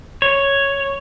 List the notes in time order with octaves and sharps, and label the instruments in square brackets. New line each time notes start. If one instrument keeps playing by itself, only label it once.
[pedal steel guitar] C#5